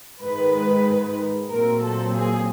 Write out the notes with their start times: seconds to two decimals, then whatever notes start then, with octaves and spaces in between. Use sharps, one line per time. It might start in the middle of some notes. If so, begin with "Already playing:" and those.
0.22 G#2 D#3 G#3 B4
1.49 A#2 F#3 A3 C4 A#4
1.82 A4
2.13 G#4